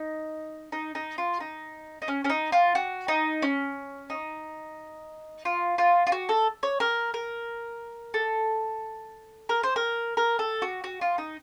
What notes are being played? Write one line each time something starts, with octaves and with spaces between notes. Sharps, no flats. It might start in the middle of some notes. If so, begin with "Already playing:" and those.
Already playing: D#4
D#4
D#4
F4
D#4
D#4
C#4
C#4
D#4
F4
F#4
D#4
C#4
D#4
F4
F4
F4
F#4
A4
C#5
A#4
A#4
A4
A#4
C5
A#4
A#4
A4
F#4
F#4
F4
D#4